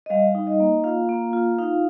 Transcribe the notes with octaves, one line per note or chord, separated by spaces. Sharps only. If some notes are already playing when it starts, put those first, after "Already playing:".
D#5
G3 F5
D#4
D#5
A#3
F4 F5
A#3
F4
D#4 F5